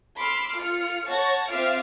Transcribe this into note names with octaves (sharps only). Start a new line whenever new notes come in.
B5 C6 D6 E6 F6
F4 F6 C#7
C#5 F#5 A5 C#6 A#6
C4 F4 E5 F5 D6 F6